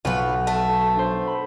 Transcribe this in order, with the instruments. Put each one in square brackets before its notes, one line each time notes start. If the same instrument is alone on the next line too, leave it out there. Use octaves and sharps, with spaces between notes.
[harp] B1 F#3 F#5 [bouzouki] F4 B4
[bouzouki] A3
[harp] D4 C5
B5